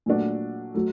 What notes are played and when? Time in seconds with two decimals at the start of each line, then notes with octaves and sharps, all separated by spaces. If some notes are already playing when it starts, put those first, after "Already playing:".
0.06 A#2 F#3 A3 D4 F#4
0.74 F#3 A3